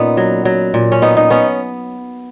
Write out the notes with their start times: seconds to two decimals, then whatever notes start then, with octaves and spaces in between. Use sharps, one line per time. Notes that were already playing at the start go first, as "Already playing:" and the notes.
Already playing: A#2 B3 C#4 D#4
0.17 F#3
0.45 F#3
0.74 A#2
0.92 C#4
1.02 B3 D#4
1.17 D#4
1.30 B3 C#4